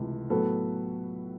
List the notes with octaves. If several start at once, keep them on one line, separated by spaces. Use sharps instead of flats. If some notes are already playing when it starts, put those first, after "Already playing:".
Already playing: C#2 C3 E3 A3
A2 F#3 B3 A4 B4